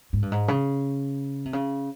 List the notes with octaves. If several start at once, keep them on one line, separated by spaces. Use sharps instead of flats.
G#2
G2
G#2
C#3
C3
C#3